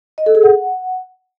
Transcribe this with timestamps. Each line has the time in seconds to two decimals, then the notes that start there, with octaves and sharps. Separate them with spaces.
0.18 D#5
0.26 A4
0.35 G#4
0.43 F#5